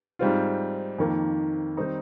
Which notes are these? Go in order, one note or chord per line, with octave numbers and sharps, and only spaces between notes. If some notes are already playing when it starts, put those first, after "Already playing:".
G#2 G3 C4 F4
F2 D#3 A#3
D#3 G3 C4 D#4